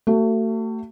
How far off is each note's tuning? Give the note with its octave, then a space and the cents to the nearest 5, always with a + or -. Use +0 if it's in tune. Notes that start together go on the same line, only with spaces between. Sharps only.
A3 +35 F#4 +35